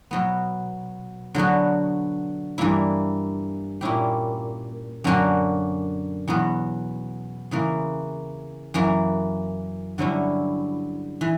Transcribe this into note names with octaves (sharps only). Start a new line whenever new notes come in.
B2 F#3 B3
D3 F#3 B3 F#4
G2 E3 A#3 E4
A#2 A#3 C#4 E4 G4
F#2 D3 A#3 C#4 F#4
E2 B2 F#3 B3
C#3 E3 A#3
F#2 E3 A#3
G2 D3 F#3 C#4 E4
E3